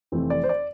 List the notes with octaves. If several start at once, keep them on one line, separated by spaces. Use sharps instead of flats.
F1 F2 E3 A3 C4
D5
C5
D5